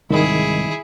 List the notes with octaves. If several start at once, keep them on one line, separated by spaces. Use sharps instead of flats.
C2 G#2 D#3 E4 G#4 D#5